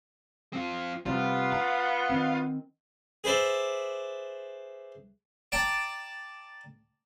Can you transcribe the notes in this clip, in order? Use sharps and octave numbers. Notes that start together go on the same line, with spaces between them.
C4 F4
C3 G3 B3 F4
A#5
D#3 C4
G#4 B4 C5 D5 E5
D5 G5 A5 A#5